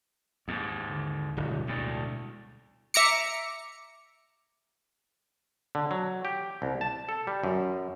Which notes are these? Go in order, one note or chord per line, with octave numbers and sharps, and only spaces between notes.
D#2 G#2
D3
D1 G1 B2 G3 G#3
D2 A2
E5 A#5 D6 C#7
D3
F#3
G4
C2
A5
A4
G3
F#2